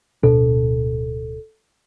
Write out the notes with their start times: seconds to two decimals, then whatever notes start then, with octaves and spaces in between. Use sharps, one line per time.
0.23 D1 B2 D4 A4